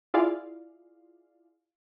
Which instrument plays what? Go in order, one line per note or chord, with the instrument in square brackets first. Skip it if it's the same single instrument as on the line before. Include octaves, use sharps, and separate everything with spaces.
[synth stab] E4 F4 G#4 D5 F5